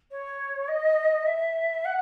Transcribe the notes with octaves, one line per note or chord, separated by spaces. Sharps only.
C#5
D#5
E5
F#5